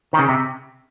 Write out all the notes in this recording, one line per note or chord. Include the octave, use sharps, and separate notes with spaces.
D#3
C#3
C3